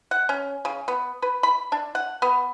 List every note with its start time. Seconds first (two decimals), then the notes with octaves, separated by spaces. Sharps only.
0.11 F#5
0.29 C#4
0.65 C#3
0.88 B3
1.22 B4
1.43 B5
1.72 D4
1.95 F#5
2.22 B3